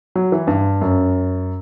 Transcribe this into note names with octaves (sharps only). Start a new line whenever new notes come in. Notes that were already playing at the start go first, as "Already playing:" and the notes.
F#3
E3
G2
F#2